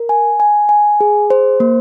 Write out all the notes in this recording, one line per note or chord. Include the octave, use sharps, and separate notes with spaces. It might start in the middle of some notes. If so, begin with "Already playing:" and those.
Already playing: A#4
G#5
G#5
G#5
G#4
C5
A#3